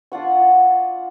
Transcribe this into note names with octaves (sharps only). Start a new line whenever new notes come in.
D4 F4 F#5 C#6